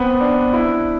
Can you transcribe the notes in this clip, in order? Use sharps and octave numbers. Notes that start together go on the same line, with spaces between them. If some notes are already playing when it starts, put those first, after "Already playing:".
Already playing: B3 C4
D4
E4